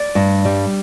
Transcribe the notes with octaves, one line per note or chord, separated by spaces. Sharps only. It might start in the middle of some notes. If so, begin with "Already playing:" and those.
Already playing: D5
G2
G3